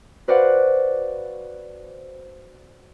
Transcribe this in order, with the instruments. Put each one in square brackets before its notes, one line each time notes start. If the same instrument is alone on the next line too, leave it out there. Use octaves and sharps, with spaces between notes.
[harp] F#4 B4 C5 D5 F5 F#5